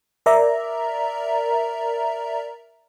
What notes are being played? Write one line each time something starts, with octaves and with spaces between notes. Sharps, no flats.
A#4 D5 E5 A#5